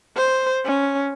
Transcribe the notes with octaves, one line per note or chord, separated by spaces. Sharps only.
C5
C#4